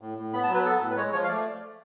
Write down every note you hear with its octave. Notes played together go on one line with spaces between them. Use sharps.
A2
A2
B3 B5
A5
F#3
B4
B3 A4
A2
B4
G#3 C#5
F3 C#5
F5
A3 D5